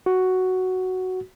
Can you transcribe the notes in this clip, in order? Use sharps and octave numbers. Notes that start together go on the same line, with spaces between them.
F#4